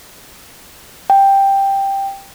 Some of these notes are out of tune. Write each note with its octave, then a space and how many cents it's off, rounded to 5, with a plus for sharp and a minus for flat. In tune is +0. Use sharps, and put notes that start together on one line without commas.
G5 +5